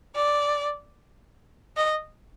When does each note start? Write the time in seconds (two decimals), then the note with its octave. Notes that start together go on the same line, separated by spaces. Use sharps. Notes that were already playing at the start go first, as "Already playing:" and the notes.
0.15 D5
1.76 D#5